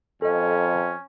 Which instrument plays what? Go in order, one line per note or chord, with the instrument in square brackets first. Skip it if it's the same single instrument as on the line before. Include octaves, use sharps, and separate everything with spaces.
[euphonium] F2 [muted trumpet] C#4 [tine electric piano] A4 D#5